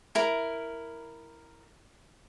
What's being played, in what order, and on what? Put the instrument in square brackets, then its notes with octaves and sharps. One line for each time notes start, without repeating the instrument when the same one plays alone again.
[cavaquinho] E4 A#4